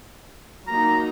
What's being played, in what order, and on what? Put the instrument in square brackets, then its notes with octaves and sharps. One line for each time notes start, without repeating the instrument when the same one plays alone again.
[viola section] F#3 A#3 D#4 [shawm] A#5